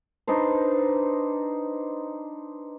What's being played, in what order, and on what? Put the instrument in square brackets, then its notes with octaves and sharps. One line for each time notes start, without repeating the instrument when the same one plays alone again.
[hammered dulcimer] D4 D#4 B4 C5